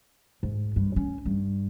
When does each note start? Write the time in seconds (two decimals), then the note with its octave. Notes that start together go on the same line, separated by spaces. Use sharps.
0.43 G#2
0.76 G2
0.96 C#4
1.26 G2